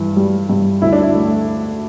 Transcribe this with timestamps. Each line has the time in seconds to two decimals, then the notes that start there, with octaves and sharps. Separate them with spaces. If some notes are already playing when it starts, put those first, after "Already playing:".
Already playing: G2 E3
0.17 G3
0.49 G2
0.82 D2 E4
0.92 D4
1.02 E4
1.15 A3